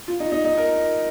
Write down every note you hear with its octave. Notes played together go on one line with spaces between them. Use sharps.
F4
D#4
D#4
D#4
A#4